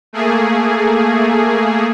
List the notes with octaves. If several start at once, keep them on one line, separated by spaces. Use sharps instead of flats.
A3 A#3 G#4